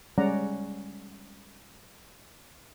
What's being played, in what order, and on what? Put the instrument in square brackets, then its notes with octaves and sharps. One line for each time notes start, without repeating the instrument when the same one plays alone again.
[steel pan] G3 G#3 C#4 D5 F#5 A#5